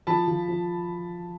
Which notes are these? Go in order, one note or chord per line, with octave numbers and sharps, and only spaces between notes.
F3 A5 B5
F3
F3